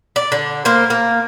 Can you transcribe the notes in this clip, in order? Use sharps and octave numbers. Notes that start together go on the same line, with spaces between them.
D5
D3
A#3 C5
A#3